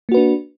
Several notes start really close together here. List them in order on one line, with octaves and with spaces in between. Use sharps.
A#3 F#4 B4 D4